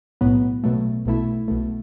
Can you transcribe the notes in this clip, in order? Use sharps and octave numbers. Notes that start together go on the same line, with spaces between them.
B1 A2 F#3 B3
B2 F#3 A3
B1 B2 A3 E4
B1 B2 A3